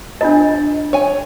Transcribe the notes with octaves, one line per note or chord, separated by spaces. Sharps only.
D4 F4 D#5
C#5 G#5